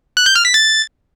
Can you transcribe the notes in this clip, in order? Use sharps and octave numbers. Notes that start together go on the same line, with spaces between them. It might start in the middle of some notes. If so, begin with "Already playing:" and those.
F#6
G6
F6
B6
A6